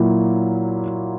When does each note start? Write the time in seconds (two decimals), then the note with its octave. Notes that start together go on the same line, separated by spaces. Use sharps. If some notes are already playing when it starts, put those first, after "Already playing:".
Already playing: A#2 F#3 A#3 E4